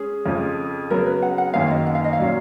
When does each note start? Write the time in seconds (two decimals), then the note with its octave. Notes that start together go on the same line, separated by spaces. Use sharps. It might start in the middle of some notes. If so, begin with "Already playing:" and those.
Already playing: G#3 C#4 G#4
0.26 F2 C#3 F3
0.90 C#3 F#3 B3 A#4
1.06 B4
1.22 F#5
1.38 F#5
1.54 F#2 D#3 A#3 C#4 F5
1.71 D#5
1.87 F#5
1.95 F5
2.04 D#5
2.13 F5
2.19 A#2 F#3 C#4